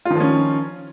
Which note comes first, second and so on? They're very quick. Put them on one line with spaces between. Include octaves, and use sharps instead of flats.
F4 D#3 F3 C#4